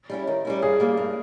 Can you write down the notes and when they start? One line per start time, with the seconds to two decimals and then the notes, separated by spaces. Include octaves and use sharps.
0.10 G3 C#4 E4
0.27 D#3
0.45 G3 C#4 E4
0.62 G2 G#4
0.80 G3 A#3
0.97 G2